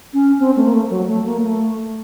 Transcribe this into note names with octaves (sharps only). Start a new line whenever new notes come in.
C#4
C4
A3
A#3
A3
F#3
A3
A#3
A3